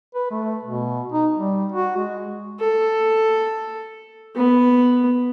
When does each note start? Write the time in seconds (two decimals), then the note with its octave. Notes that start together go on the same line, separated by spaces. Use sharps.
0.15 B4
0.31 A3
0.63 B2
1.12 D#4
1.34 G3
1.72 F#4
1.97 G#3
2.59 A4
4.36 B3